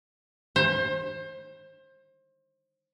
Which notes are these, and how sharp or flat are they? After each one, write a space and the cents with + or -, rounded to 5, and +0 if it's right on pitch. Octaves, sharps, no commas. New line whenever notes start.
C5 +30